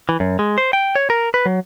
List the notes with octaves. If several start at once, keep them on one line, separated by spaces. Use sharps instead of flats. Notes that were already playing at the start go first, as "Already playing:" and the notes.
E3
F#2
G#3
C5
G5
C#5
A#4
B4
F#3